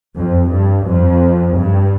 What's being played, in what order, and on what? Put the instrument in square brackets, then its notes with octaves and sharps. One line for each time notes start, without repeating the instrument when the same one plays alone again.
[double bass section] F2
G2
F2
G2